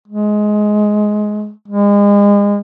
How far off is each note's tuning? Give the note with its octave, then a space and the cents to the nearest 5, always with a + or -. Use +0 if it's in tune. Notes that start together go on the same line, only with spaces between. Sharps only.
G#3 +15
G#3 -35